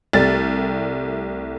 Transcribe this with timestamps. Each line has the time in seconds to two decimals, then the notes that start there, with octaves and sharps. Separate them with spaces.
0.13 C2 G3 A3 A6